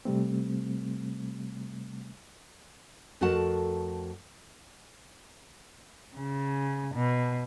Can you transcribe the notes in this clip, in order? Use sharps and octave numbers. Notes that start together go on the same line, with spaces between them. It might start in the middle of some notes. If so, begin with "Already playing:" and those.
C3 G3 A3 C4
F2 A3 F#4 A#4 F#5 A5
C#3
B2